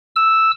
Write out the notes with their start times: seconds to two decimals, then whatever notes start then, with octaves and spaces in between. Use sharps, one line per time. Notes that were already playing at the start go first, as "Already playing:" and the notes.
0.16 E6